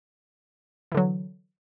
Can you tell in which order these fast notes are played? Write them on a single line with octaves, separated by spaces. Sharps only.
E3 D3 F#3